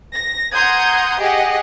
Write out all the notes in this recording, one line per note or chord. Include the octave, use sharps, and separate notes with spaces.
A#6
F#5 A#5 C6 D#6 G6 G#6
G4 G#4 D#5 F#5